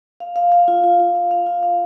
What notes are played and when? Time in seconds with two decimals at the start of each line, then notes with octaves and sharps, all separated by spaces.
0.20 F5
0.36 F5
0.52 F5
0.68 F4
0.84 F4
1.00 F4
1.15 F5
1.31 F5
1.46 F4
1.63 F5